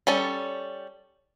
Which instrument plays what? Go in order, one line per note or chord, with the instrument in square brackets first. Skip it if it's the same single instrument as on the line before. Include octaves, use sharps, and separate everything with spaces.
[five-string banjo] G3 C#4 A4